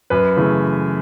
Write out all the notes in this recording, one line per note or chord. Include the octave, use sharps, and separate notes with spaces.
F#2 B4
C#3 E3 A3